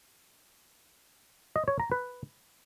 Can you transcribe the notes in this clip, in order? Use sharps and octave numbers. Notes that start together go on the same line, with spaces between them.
D#5
C#5
A#5
B4